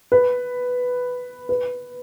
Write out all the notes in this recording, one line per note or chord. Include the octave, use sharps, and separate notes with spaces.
B4
B4